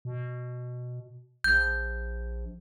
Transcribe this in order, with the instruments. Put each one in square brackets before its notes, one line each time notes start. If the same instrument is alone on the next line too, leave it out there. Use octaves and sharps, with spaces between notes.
[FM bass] B2
[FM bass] A#1 [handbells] G6